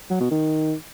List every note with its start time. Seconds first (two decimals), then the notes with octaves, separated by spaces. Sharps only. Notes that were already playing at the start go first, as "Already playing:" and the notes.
0.10 F#3
0.21 B2
0.31 D#3